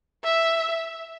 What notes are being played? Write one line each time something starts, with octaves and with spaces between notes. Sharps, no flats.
E5